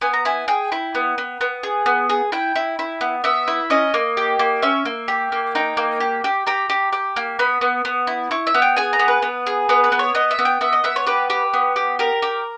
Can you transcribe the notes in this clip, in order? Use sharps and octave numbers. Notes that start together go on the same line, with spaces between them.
B3 G#5
A#5
E4 G#5
G#4 G5
E4
B3
B3
B3
G#4
B3
G#4
E4 G5
E4
E4
B3
B3 E5
E4
C#4 D#5
A#3
G4
A#3
C#4 E5
A#3
G4
A#3
D#4 G5
A#3
G4
G4
G4 A#5
G4
G4
A#3
B3 B5
B3
B3
E4
E4 C#6
E5
B3
G5
G#4 G#5
A#5
B3
B4
B3
G#4
B3 B4
B4
B3
C#5
B3 D#5
E5
B3
G5
B3 E5
D#5
B3 E5
C#5
G4 B4
G4
B3
G4
G4 A#4
G4